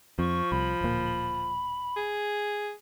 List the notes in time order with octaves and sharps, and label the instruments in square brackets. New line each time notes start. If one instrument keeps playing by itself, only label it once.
[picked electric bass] F2 [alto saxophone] F3 [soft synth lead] C#6
[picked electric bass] C2 [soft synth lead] B5
[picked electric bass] D1 A#2
[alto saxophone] G#4